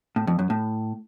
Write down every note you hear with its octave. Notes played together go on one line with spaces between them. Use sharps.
A2
F2
F#2
A2